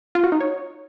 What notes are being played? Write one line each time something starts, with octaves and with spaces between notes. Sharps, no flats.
F4
F#4
D#4
C#5